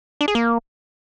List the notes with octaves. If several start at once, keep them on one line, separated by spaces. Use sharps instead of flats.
D4
G#4
A#3